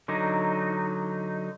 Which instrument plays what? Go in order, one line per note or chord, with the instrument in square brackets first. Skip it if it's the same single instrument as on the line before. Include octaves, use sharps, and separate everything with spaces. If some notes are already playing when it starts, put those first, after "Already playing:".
[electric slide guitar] D3 F#3 D#4